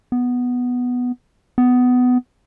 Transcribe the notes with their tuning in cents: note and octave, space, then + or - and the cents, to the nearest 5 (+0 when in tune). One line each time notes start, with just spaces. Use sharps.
B3 +0
B3 +15